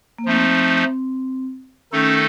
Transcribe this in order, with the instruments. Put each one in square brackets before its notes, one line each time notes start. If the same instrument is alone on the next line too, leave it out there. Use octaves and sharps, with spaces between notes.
[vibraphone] A#3
[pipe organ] F3 A3 D#4 [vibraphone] C4
[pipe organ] D#3 A3 D#4 A4 [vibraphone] C#4